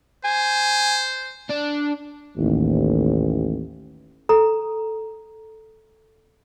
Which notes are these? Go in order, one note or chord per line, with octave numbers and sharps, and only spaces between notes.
C5 G#5
D4
A1 D#2
A4 A#5